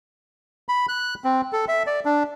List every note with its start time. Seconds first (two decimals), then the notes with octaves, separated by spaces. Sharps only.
0.69 B5
0.89 F#6
1.24 C4
1.53 A4
1.68 E5
1.87 D5
2.05 D4